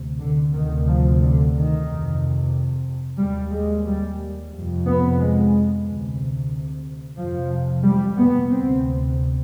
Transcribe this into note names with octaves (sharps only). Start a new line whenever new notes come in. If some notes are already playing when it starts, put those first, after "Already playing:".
Already playing: D2 C3
D3
D2 C3 D#3
F3
D3
D#3
F2 C3
D#2 G3
G#3
G3
F2 C3
B3
G#3
D2 C3
F2 C3 F3
G3
B3
D2 C3 C4